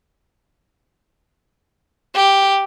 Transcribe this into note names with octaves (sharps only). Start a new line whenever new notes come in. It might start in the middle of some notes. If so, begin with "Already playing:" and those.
G4